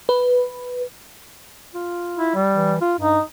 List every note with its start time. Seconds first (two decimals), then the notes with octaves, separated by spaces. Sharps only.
0.09 B4
1.74 F4
2.17 E4
2.35 G3
2.54 E3
2.81 F4
2.99 G2 D#4